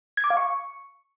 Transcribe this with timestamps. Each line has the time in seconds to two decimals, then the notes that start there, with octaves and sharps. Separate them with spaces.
0.17 G#6
0.24 D6
0.30 F5
0.37 C#6